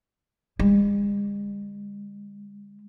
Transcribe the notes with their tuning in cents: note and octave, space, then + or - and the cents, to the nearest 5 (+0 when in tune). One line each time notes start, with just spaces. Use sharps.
D3 -35 G#3 -45